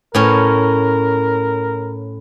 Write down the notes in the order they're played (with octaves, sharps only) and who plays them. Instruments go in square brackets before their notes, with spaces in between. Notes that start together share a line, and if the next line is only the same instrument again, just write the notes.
[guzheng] A2 C#4 [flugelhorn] A#4